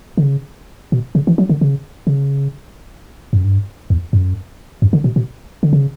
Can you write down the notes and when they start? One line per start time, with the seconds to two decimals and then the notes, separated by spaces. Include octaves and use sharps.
0.18 D3
0.23 C#3
0.92 B2
1.15 C#3
1.27 E3
1.38 F#3
1.49 D3
1.61 C#3
2.07 C#3
3.33 F#2
3.45 G2
3.90 E2
4.13 F#2
4.82 F#2
4.93 D3
5.04 B2
5.16 B2
5.63 D3
5.73 C#3